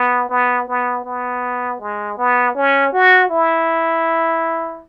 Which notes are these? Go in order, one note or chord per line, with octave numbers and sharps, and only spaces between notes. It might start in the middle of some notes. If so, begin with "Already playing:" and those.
Already playing: B3
B3
B3
B3
G#3
B3
C#4
F#4
E4